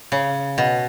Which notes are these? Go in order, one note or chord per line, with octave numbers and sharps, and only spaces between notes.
C#3
B2